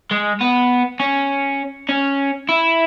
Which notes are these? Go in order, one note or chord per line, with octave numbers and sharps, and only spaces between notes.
G#3
B3
C#4
C#4
E4